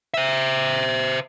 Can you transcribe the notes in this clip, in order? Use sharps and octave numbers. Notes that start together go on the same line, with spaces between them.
C5 E5